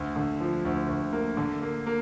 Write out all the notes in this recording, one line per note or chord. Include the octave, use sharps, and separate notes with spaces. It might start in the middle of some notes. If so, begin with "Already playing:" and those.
Already playing: D2
D3
F3
D2
D2
A#3
D3
A#3
A#3